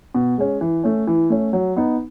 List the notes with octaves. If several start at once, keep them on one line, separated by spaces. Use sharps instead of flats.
B2
G#3 C#4
E3
A3 C#4
E3
A3 C#4
F#3
B3 D#4